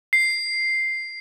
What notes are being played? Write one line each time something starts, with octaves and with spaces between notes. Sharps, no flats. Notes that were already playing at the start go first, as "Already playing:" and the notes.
C7